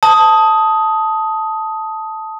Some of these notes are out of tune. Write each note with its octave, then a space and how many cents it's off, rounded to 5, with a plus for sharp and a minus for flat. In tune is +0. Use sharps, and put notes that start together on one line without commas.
A5 +0 D#6 +10